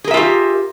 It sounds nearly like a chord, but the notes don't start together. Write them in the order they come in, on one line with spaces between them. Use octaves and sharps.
G#4 A#4 E5 F4 G4